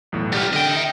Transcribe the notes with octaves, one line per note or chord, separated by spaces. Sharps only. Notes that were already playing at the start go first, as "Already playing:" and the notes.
B1 E2 A2
G3 B3 F6 A6
D3 D#5 G5
E5